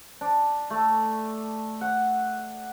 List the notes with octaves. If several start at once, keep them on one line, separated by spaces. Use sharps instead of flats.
D4
A3
F#5